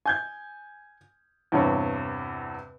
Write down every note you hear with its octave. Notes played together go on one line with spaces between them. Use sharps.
G#5 G6 G#6
E2 G2 C3 C#5